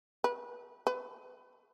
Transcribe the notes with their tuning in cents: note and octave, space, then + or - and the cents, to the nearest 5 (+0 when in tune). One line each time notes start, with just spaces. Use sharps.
B4 -25
B4 +20